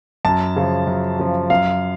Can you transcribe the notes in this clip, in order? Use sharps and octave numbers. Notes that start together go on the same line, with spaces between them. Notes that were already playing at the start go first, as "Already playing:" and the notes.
F#2 A5
C#3 F3
F#2
C#3 F3
F#2 F5